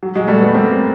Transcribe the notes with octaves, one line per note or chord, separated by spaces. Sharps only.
F#3
F#3 G#3
G3 A3
A3 B3
A#3 C4